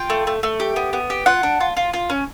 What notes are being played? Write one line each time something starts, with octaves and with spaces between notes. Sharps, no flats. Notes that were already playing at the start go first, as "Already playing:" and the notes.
Already playing: F4 G5
A3
A3
A3
G4
B3
B3
G4
F4 F#5
D4
F4
F4
F4
C#4